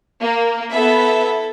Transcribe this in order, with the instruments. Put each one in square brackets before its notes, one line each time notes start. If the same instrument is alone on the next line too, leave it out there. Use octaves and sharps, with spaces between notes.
[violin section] A#3
[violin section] B3 E5 [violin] E4 A4